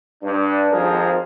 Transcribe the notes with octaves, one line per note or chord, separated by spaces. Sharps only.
G2 D4
G#1 F2 F3 G#4 A#4